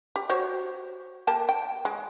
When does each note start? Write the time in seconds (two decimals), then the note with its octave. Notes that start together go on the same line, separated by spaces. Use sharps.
0.16 G4
0.30 F#4 C5 C#5
1.27 A#3 G4 A5
1.49 G5
1.85 G#3